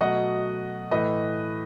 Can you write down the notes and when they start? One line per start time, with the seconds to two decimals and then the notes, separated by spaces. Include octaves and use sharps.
0.01 B2 F#3 A3 D#5 F#5
0.91 A2 E3 A3 B4 D#5